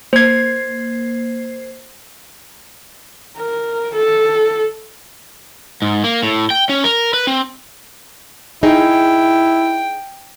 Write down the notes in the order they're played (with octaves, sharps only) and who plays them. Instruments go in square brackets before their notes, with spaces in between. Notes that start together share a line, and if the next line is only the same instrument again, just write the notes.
[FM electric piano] A#3 C7 [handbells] C5 G#6
[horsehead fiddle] A#4
A4
[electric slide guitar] G#2
A#3
A2
G5
C#4
A#4
B4
C4
[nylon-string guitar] D#4 G#4 [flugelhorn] E4 [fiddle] G5